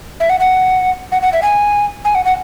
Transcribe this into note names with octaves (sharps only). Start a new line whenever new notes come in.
E5
F#5
F#5
F#5
F#5
E5
G#5
G#5
F#5
F#5